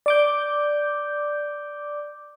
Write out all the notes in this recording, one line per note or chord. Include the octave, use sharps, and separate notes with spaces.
D5 D6 G6